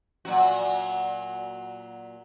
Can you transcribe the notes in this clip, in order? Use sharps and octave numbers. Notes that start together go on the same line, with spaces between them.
A#2 F#3 F#4